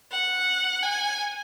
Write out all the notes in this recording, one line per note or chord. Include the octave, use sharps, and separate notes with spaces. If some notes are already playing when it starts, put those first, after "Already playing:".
F#5
G#5